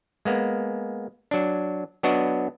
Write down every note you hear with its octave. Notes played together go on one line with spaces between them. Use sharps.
G#3 A#3 B3
F#3 D4
F#3 B3 D4 F#4 C#5 D#5